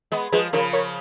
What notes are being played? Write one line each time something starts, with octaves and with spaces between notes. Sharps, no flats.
G#3 B3
F3 G#3 G#4 B4
C#3 F3 A#4 C#5
A#4 C#5